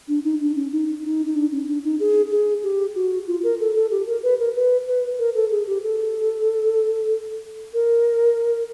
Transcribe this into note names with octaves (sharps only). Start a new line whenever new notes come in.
D4
D#4
D4
C#4
D#4
D#4
D#4
D4
C#4
D4
D#4
G#4
G#4
G4
F#4
F4
A#4
A4
A4
G4
A#4
B4
A#4
B4
B4
A#4
A4
G#4
G4
A4
A#4